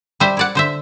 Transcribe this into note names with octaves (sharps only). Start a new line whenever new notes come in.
G3 C5 E5
E4 D5 F#5
D3 C5 E5